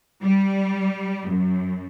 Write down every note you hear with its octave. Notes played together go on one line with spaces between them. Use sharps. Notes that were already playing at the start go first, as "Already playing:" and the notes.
G3
F#2